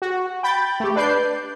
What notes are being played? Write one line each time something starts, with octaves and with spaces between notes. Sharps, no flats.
F#4
G5 B5 G6 A6
A3 G4
D4 B4 D5 G6 C7